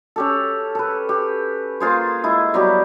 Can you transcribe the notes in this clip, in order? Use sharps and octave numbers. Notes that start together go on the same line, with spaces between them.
C#4 G4 A4
A4 B4
G4
A#3 F4 G#4 C5
G#3 E4 G#4
F#3 G3 B3 G4